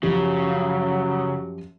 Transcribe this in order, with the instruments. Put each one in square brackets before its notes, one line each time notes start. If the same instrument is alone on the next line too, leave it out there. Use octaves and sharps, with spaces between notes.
[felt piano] F#2 F3 G4 [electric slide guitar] C#3 [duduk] F#3